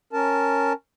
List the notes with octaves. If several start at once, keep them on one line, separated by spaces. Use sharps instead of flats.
C#4 A#4 A5